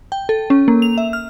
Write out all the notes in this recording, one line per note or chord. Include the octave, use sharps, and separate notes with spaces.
G5
A4
C#4
A#3
F7
E5
F6